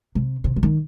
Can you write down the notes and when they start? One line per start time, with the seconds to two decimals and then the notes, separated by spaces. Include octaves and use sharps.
0.15 C3
0.44 C3
0.56 C3
0.63 D#3